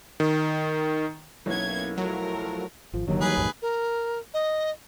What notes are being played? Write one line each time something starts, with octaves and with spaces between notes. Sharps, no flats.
D#3
B1 A#3 B3 C#4 E4 C#5 G#6
F3 F#3 A3 E4 A#4
G#1 F3
F#1 D#2 D3 D#3 F#3
E3 G3 G#4 B4
A#1 F2 G#2
A#4
D#5